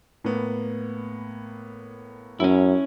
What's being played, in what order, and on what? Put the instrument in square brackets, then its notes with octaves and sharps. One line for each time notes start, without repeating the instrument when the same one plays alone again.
[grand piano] A2 A#3 B3
[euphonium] F#2 [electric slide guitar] C#4 E4